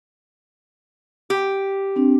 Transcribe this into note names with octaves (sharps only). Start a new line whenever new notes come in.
G4
C4 D4